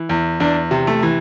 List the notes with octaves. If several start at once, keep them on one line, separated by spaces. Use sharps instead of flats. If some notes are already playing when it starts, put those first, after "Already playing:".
Already playing: E3
E2
E2 D4
C3
A3
E3